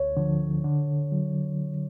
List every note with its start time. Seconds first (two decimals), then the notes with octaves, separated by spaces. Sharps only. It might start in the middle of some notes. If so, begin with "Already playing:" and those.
Already playing: D2 C#5
0.17 D3 F3
0.64 D3
1.12 F#3